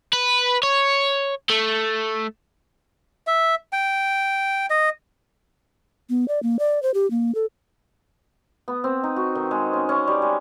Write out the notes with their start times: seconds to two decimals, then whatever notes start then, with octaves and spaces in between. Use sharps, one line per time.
0.13 B4
0.63 C#5
1.50 A3
3.27 E5
3.73 G5
4.70 D#5
6.10 B3
6.28 D5
6.43 A#3
6.59 D5
6.83 C5
6.94 G4
7.11 A#3
7.35 A4
8.68 B3
8.84 C4
9.04 D#4
9.16 F#4
9.35 D#3
9.51 G#3
9.73 C#4
9.89 C#4
10.08 G3
10.22 G#3